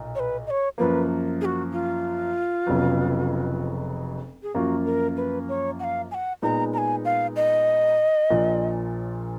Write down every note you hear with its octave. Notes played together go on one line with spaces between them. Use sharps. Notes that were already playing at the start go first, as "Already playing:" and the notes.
Already playing: B1 A#2
C#5
B4
D#5
C#5
F#2 F3 A#3 B4
G#4
F#4
F4
F1 F2 C#3 F#3 B3
G#4
F#2 F3 A#3 F4 F#4 G#4
A#4
B4
C#5
F#5
F5
G#5
F#5
A#2 G#3 B3 D#4 A#5
A#5
G#5
F5
D#5
A#1 A#2 F3